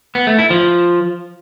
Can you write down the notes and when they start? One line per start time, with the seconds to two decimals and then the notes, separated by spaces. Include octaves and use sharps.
0.15 B3
0.27 A3
0.39 E4
0.50 F3